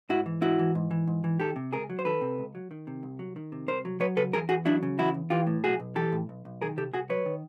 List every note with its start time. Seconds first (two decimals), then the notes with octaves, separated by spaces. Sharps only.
0.09 G#2 E4 F#4
0.26 E3
0.42 G#2 E4 F#4
0.59 E3
0.75 G#2
0.91 E3
1.07 G#2
1.24 E3
1.40 D#3 G4 A4
1.56 C3
1.72 C#2 G#4 A#4
1.90 F#3
1.99 C5
2.05 D#3 A4 B4
2.21 C3
2.38 C#2
2.55 F#3
2.71 D#3
2.87 C3
3.03 C2
3.19 F#3
3.36 D#3
3.52 C3
3.68 C2 A#4 C5
3.85 F#3
4.00 F#3 B4 C#5
4.16 C#3 A4 B4
4.33 E2 G#4 A#4
4.49 E2 F#4 G#4
4.65 F#3 D4 E4
4.83 C#3
4.98 E2 E4 F#4
5.14 E2
5.30 E3 F4 G4
5.47 A2
5.64 B1 F#4 G#4
5.80 B1
5.95 E3 G4 A4
6.12 A2
6.29 B1
6.45 B1
6.62 D#3 G#4 A#4
6.77 C3 G4 A4
6.93 C2 F#4 G#4
7.09 F#3 B4 C#5
7.26 D#3